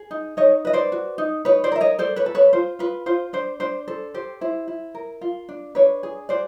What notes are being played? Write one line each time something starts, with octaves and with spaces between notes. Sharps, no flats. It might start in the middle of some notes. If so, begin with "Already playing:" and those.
Already playing: G#4
D#4
D#4 C#5 D#5
B4 D#5
C5 D5
F#4
D#4
D#4 B4 C#5
C5 D5
A#4 E5
C#5 D#5
A4 C5 D5
B4 C#5
A4
B4 C#5
F4 C5
F4 B4
F4 C5
D4 C5
D4 C5
A4 C5
G4 C5
E4 C5
E4
A#4
F4
D4
D4 B4 C#5
G#4
F#4 C5 D5